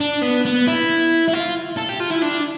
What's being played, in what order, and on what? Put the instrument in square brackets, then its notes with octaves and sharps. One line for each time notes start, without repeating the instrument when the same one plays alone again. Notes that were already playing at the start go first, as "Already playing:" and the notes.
[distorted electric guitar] D4
B3
B3
E4
E4
F4
A4
G4
F4
E4
D4